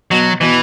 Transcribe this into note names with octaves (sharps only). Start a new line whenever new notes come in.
B2 F#3
B2 E3